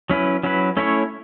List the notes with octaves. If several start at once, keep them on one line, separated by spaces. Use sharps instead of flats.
F#3 C#4 E4 B4
F#3 C#4 E4 B4
A3 C#4 E4 C#5